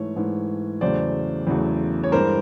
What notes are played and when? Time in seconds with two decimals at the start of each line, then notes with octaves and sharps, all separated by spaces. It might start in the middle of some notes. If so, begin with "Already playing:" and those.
Already playing: G#2 E3 A3 C#5
0.16 G#2 E3 A3
0.81 E2 C#3 F#3 A3 C5 D5
1.47 E2 C#3 F#3 A3
2.04 C#5
2.12 G2 E3 G#3 A#4 C5